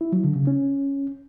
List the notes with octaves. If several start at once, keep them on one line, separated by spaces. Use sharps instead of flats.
E4
F#3
D3
C#3
C#4